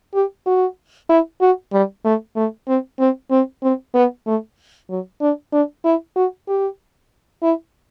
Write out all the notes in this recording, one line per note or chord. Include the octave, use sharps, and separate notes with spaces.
G4
F#4
E4
F#4
G3
A3
A3
C4
C4
C4
C4
B3
A3
F#3
D4
D4
E4
F#4
G4
E4